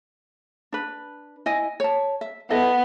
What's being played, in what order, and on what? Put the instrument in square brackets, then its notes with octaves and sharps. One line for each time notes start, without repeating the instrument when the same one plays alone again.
[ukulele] D4 B4
E4 D#5 G#5
C#5 A5
E5
[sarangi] B3 [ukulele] E4 A4 D#5